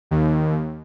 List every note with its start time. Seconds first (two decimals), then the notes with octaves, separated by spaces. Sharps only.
0.11 D#2